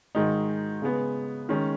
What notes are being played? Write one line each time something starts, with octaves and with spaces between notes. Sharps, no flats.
G#2 D#3 G#3 D#4
C#3 G#3 B3
D#3 G#3 C#4